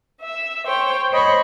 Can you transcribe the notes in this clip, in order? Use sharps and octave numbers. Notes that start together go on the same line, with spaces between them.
E5
C5 C#5 G5
C5 C#5 D#5 B5 C#6